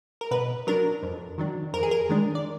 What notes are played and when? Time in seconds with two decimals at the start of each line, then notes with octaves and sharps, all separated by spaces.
0.21 A#4
0.31 B2 B4
0.67 F#3 D4 A#4
1.03 F2
1.38 D#3 F#3 D4
1.74 F2 A#4
1.83 G#4
1.91 A#4
2.09 D#3 G#3 D4
2.35 D5